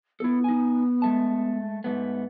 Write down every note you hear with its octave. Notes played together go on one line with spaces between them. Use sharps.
B3 E4 A4
D#4 G#5
G#3 A3 A5
G#2 A3 B3